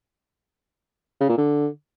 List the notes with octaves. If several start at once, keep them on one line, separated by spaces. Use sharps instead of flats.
C#3
A#2
D3